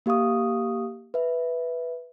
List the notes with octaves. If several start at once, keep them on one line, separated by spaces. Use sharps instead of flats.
A#3 G4 F5 C#6 D#6
B4 E5